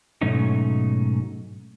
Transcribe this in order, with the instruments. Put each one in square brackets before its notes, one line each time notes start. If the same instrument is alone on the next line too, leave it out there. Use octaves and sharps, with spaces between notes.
[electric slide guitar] G#2 B2 F#3 A3 C#4 D#4